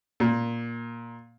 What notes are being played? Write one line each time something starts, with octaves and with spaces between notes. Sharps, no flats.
A#2